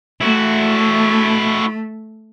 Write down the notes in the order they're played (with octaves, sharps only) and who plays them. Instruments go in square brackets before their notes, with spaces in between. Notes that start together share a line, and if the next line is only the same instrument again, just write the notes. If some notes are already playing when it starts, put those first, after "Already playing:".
[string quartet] A3 [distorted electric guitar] E4 F#4